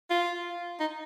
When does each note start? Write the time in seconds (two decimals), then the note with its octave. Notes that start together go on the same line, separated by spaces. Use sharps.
0.10 F4
0.80 D#4